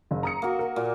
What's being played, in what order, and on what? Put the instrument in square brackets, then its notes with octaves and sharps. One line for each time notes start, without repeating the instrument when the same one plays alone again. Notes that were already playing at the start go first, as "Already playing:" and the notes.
[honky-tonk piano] F#1
A#5 D#6 C#7
[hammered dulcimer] A#3 F#4
[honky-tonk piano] A#4
[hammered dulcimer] A#2